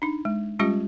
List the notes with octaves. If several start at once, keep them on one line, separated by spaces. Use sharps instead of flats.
D4 D#4
G#3
G3 G#3 C#4 F4 G4